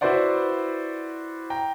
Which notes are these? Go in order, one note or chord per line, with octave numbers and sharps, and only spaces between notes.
E4 F#4 B4 C5 D5 F#5
G5 A#5